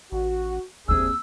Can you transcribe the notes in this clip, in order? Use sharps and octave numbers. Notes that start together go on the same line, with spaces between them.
A1 F#4
F#1 D#2 C3 C4 D4 G#4 E6